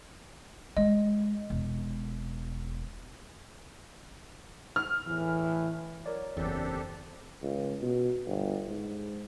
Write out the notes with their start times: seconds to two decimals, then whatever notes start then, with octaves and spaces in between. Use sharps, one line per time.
0.77 G#3 D#5
1.50 E1
4.76 F6
5.07 E2 A2 E3
6.06 F#3 A#4 C#5 D5
6.37 F#1 E2 C4 D4 G4 A4
7.43 C#2
7.82 B2
8.26 G1
8.69 G#2